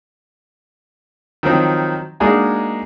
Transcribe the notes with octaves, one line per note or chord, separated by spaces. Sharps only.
D#3 F3 F#3 C4 D#4
G#3 A#3 D4 D#4 F#4 G#4